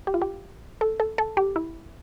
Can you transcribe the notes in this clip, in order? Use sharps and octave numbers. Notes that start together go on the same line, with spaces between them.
G4
F4
G4
A4
A4
A4
G4
E4